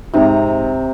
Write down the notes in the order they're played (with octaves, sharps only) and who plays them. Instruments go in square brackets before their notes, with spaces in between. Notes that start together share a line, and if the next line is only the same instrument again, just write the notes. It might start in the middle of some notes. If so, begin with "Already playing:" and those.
[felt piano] G#2 C4 D#4 [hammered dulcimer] C3 A#5